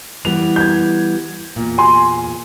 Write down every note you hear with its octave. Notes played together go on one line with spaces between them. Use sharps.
E3 G3 B3 F7
G6 G#6
E2 A#2
G#5 C6